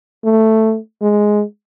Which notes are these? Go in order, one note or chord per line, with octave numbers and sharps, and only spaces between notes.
A3
G#3